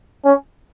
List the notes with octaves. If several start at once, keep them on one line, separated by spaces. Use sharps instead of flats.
C#4